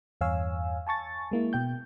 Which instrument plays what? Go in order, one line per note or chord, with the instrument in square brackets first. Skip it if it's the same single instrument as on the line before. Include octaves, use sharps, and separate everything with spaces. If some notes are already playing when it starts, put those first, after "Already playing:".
[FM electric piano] E2 G2 C#5 F5 G#5 E6
G#5 A5 C#6 A6
G#3 A#3 E4
B2 G5 G6